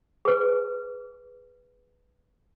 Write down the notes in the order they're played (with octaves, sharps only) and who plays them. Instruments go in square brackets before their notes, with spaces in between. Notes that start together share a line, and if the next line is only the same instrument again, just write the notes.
[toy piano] G#4 B4